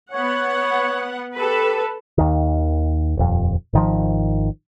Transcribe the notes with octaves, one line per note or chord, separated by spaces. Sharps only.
B3 C#5 F#5
G4 A4 B4
D#2 D#3
D#1 F2
G#1 D#3 F3